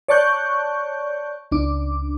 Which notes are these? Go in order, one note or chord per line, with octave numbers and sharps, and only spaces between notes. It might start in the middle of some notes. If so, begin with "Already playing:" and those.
C#5 D5 A5 C#6 F#6 G6
C#2 D4 D6